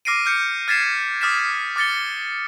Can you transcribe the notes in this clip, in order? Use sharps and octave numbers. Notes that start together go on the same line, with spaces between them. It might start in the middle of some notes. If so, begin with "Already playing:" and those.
D6 F6 A#6 C7 D7 D#7
F6 G6 C#7
F6 G#6 A6 B6 C7 E7
D6 D#6 F6 A6 B6 E7
D6 F6 A6 C#7 G7